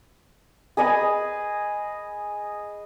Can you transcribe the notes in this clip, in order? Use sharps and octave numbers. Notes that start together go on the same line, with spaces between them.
G#4 B4 D#5 G#5